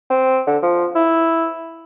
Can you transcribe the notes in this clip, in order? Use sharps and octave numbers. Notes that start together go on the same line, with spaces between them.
C4
D3
F3
E4